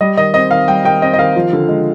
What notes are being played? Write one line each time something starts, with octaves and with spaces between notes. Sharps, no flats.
G3 D#5
D#3 D#5
C4 D#5
D#3 F5
G3 G5
D#3 G5
C4 D#5
D#5
D#3 F5
F3
D3
G#3